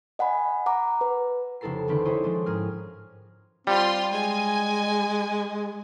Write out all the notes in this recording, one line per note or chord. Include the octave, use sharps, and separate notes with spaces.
D#5 F#5 G#5 B5
F#5 A#5 D6
B4
F1 C#3 E4 A4 A#5 C7
C#2 D3 D#3 C4 B4 B6
E4 C5 C#5 D#5
F3 G#3 C4 D4
G#2 C#4 G#4 A#4 F6
G3 C4 F4 C6
G#3 G#5